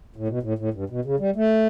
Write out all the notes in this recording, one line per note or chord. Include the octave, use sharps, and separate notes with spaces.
A2
B2
A2
A2
G2
B2
C#3
G3
A3